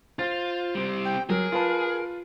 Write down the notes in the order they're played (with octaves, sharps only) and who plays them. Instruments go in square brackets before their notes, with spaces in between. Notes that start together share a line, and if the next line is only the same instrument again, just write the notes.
[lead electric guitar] F4 [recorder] C5 [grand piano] A6
[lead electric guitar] G3 C4
[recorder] G5
[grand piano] F#3 [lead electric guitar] G#4 [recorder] A#4
[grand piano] F4 B4 A5